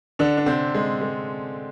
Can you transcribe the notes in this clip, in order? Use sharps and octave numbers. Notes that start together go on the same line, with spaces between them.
D3 D4
D4
C3 C4
G#3
G#3